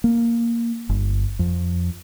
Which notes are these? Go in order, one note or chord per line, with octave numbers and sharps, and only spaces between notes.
A#3
G1
F2